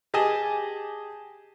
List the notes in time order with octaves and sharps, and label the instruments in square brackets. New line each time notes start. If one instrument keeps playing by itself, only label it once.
[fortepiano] G4 G#4 D#5 G#5 A5